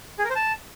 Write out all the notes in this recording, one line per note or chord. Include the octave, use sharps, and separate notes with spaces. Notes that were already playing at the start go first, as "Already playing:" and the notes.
G#4
A#4
C5
A5